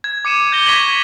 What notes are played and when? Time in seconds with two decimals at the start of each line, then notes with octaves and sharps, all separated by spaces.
0.04 G#6
0.25 D6 C#7 D#7 E7
0.52 G6 G#6 A#6 G7
0.67 C#6 G#6 B6 D#7 F7 F#7